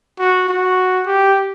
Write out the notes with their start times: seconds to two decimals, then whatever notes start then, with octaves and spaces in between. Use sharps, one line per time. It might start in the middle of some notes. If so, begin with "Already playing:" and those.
0.19 F#4
0.49 F#4
1.06 G4